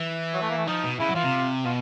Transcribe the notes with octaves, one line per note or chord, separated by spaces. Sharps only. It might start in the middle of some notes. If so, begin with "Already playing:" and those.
Already playing: E3
F#3
A3
A#3
A3
F3 D#4
B2
C#3 E4
F#3
E3 F4
C3
B2 F4